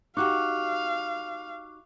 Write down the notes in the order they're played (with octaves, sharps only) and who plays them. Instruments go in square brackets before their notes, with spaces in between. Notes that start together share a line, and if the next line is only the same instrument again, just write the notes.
[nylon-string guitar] D#4 F#4 G4 [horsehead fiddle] F5 [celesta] C#6 D6 F#6